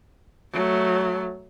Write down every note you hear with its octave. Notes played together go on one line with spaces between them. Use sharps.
F#3 A3